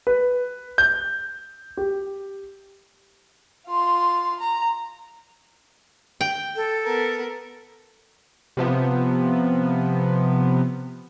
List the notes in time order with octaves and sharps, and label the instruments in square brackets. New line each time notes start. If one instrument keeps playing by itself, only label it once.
[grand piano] B4
G6
G4
[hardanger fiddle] F4 C6
A#5
[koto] G5
[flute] A4
[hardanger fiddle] B3 A#4
[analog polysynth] C3 F3 B3